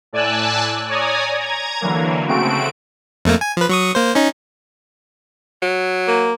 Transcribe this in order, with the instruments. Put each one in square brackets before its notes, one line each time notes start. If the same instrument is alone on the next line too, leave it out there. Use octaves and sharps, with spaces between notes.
[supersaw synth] A2 D5 G#5 A5 E6 F#6
C#5 D5 G#5 A#5 D#6
A#5 G#6
D3 E3 F#3 A#3
C#3 A3 C4 F#4 D7
[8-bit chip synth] F2 A3 A#3
G#5
F3 B4
F#3 C#6 D#6
A#3 C5
C#4 D#4
[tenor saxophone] F#3
[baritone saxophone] A#3